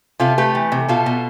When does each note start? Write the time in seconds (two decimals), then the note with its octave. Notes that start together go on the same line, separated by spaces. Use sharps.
0.20 C3 F4 A4
0.38 A3 G4 B4
0.55 E3
0.72 C3
0.89 B2 F4 A4
1.06 B2